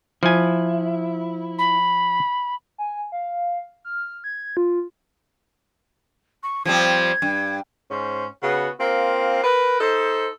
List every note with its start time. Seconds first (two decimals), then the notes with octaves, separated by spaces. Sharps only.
0.23 F3 E4 G#5
1.58 B5
2.78 G#5
3.12 F5
3.85 F6
4.24 G#6
4.57 F4
6.43 C#6
6.66 F3 G3 C4 G#6
7.22 G2
7.91 G#2 C#4 C5
8.43 C#3 B3 F#4
8.80 A#3 C4 F4
9.44 A#4 B4
9.81 D#4 A4 C5